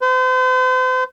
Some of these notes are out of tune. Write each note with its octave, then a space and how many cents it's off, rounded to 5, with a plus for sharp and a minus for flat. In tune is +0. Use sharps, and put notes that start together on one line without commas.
C5 -40